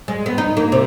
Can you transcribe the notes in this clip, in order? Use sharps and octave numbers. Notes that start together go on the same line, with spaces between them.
G#3
B3
D#4
A#3
C3